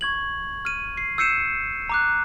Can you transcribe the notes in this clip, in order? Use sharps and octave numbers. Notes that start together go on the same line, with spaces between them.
C#6 G#6 F#7
F6 D#7
C7
E6 G6 C7 C#7 D#7 E7
A#5 D6 F#6